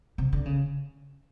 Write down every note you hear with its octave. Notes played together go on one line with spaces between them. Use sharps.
C3
D3
C#3